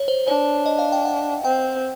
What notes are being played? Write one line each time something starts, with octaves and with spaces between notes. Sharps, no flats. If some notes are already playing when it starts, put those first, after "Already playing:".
Already playing: C#5
C5
D4 C#5
D#5
F5
G5
F#5
C4 G5